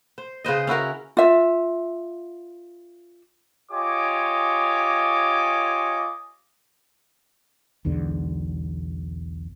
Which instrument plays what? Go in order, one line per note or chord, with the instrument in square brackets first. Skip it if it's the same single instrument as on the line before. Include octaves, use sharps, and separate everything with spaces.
[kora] C5
C#3 B4 C5 D#5
C#4 E4 F#4 A#4
[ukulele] F4 E5
[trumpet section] F4 G4 C#5 D#5 G#5 D6
[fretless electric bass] E1 B1 E2 D3